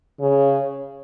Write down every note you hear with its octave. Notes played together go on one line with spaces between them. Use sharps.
C#3